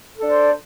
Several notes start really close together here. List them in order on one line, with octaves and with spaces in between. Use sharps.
A4 D4 D5 C5